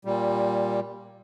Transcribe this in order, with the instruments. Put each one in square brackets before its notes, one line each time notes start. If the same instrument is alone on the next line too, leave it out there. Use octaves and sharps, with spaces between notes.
[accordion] A#2 G3